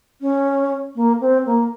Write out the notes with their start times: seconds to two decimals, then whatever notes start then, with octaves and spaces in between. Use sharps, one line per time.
0.21 C#4
0.95 A#3
1.21 C4
1.46 A#3